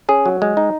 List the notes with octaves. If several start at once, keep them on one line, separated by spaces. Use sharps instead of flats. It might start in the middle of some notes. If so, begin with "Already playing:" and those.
C#4 G#4
F#3
G#3
D#4